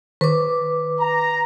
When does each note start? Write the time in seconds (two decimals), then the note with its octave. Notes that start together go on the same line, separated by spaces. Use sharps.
0.21 D#3 B4 D6
1.00 A#5